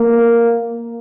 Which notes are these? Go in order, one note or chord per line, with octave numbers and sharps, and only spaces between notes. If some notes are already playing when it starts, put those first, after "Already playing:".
Already playing: A#3